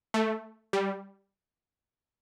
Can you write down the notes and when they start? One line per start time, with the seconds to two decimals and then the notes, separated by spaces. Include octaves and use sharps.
0.14 A3
0.73 G3